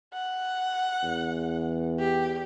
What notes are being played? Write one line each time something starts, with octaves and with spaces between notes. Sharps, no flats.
F#5
E2
G4